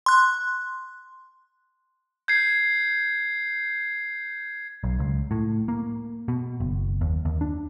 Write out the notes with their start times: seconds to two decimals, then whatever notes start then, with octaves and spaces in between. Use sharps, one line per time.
0.06 C6 F#6
2.28 G6 G#6 C7
4.84 B1
5.00 C#2
5.31 A2
5.68 A#3
6.28 B2
6.60 F#1
7.01 D#2
7.25 D#2
7.41 D4